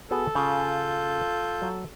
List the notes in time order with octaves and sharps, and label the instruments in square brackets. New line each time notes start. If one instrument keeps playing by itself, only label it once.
[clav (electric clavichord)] B3 F#4 G#4 [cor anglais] A4
[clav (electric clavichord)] C#3 [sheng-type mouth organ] F4 G6
[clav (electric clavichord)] F#3